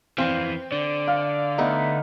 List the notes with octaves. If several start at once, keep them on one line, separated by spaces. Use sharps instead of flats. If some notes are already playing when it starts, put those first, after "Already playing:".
F2 E3 C4 F5
D3 D5
F5
A3 B3 D#4